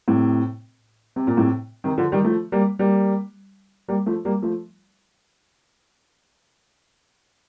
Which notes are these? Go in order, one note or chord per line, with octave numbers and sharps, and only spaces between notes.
A2 C3
C3
A#2
A2 C3
C3 D#3
D3 F3
D#3 G3
F3 A3
G3 A#3
G3 A#3
G3 A#3
F3 A3
G3 A#3
F3 A3